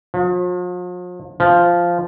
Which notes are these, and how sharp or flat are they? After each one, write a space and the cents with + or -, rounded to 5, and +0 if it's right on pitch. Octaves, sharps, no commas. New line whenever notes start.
F3 +45
F3 -5